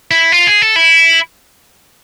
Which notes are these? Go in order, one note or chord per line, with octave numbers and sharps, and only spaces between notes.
E4
F4
G#4
A4
E4